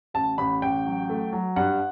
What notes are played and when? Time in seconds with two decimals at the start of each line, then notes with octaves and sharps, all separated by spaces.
0.14 A1 A5
0.38 A1 B5
0.62 A1 G5
0.86 F#3
1.09 A3
1.33 F#3
1.56 G2 F#5